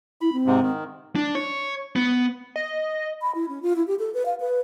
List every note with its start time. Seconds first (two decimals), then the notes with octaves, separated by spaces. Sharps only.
0.21 E4 B5
0.33 C4
0.46 G#2 C3
0.62 D#3
1.15 D4
1.35 C#5
1.96 B3
2.56 D#5
3.21 B5
3.35 E4
3.48 C#4
3.62 F4
3.76 E4
3.87 G4
3.99 A4
4.14 B4
4.25 F5
4.40 B4